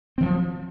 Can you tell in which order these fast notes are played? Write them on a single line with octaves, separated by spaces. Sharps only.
C4 D#3 F#3 F3